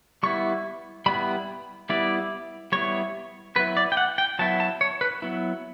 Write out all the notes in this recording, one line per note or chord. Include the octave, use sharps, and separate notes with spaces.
G3 B3 E4 C#6
G3 B3 E4 B5
G3 B3 E4 D5
G3 B3 E4 C#5
F#3 B3 E4 B4
D5
G5
F#5
G5
F#3 B3 E4 A5
A5
C#5
B4
F#3 B3 E4